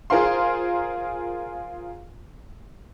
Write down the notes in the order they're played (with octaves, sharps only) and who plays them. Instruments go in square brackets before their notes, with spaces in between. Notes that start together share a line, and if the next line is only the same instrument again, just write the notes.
[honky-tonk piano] F4 G#4 A#4 C5 F5 C6